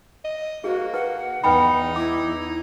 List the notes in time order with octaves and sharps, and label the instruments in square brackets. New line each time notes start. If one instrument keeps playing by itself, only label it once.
[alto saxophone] D#5
[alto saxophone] A#3 [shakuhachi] F#4 [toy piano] G#4 C5
[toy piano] B4 [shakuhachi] F#5
[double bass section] E2 [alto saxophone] D#4 [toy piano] B4 G5 B5
[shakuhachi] E4 [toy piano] D6